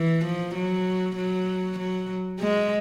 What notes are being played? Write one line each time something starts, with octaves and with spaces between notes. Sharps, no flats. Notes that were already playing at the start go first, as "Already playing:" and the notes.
Already playing: E3
F3
F#3
F#3
F#3
G#3